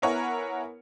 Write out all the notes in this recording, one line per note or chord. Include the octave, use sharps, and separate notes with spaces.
B3 E4 A#4 C#5 F#5 G#5